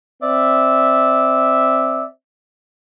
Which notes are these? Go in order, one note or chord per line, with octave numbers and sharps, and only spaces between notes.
C4 D5 E5